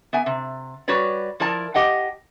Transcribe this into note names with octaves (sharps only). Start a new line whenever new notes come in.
B3 E5 G#5
C3
G3 F#4 B4 C#5 D5
F3 E4 A#4 D5 A5
G4 D#5 F#5 G5